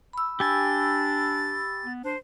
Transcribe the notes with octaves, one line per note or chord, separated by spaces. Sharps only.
B5 E6
D4 G4 G#5 A6
B3
D4 C5